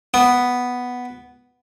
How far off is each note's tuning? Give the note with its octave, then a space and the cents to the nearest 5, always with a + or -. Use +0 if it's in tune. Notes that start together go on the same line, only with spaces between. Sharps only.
B3 +0